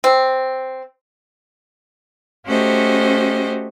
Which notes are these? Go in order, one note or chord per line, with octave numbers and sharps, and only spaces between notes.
C4
A3 C#4 F#4 G4 C5 D#5